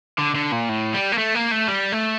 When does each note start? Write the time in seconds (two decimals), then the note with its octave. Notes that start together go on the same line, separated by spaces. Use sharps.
0.19 D3
0.35 D3
0.52 A#2
0.69 A2
0.94 G3
1.12 A#3
1.18 A3
1.35 A#3
1.52 A3
1.68 G3
1.92 A3